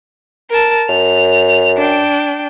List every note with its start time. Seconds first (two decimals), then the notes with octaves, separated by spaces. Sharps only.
0.51 A#4 A5
0.89 F#2 F7
1.77 D4 G5